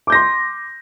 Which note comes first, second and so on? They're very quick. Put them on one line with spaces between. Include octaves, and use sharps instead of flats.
D6 G6 A#6 C6